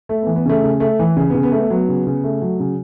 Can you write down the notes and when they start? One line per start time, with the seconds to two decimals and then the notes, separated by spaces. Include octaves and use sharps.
0.09 A3
0.22 B3
0.27 E3
0.36 B3
0.45 C#3 A3
0.64 C#3
0.80 A3
0.99 E3
1.16 C#3
1.30 B3
1.34 C#3
1.43 B3
1.52 A3
1.57 B3
1.70 F#3 B3
1.88 C#3
2.07 C#3
2.24 A3
2.42 F#3
2.60 C#3